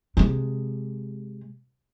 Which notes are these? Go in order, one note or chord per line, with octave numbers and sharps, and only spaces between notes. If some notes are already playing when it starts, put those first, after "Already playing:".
C3 G#3